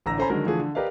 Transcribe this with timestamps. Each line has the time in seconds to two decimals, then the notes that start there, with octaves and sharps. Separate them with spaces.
0.06 A1 D3 A#5 E6 A#6
0.18 C#4 A4 C5 G#5 A#5 B5
0.30 D3 D#3 F#3 G#3 G#4 A#4
0.46 D3 E3 F3 A3 G#4
0.60 D3
0.75 G4 A#4 B4 D5 D#5 F5